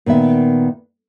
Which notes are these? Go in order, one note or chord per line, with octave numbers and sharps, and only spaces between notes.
A#2 D#3 B3 E5